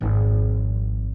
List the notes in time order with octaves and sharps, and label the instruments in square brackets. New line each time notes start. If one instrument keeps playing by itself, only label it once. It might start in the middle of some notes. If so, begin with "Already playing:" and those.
[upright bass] G#1 F2